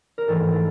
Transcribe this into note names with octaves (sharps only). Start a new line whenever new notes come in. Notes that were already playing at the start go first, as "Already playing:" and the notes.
A#4
G#2 E3 A3 A4